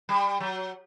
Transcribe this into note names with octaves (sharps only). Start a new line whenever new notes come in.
G3
F#3